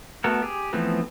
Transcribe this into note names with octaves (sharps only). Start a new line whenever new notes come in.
A3 B3 F#4 A4 A#4
G4 G#4
E3 F3 A3 B3 C4